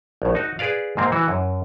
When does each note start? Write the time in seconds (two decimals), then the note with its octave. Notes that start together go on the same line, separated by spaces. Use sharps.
0.22 A#1 A2
0.35 D#4 F#4
0.59 G#4 B4 D5 F5
0.97 G#2 C3 A#3 C4
1.12 E3 F#4
1.28 F#2